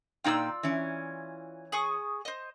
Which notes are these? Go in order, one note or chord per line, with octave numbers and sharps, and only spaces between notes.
A#2 D#4 F4 D5 G5 E6
E3 C#4
G#4 C#6 D#6
C5 D#5